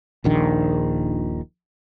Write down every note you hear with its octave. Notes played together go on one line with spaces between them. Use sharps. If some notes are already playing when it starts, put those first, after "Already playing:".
D#1 A#1 D#3 D4